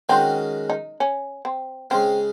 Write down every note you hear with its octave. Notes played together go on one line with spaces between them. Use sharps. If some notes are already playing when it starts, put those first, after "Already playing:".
D#3 G#3 C4 C#4 F#4
D#4
C#4
C4
C#3 G#3 C4 C#4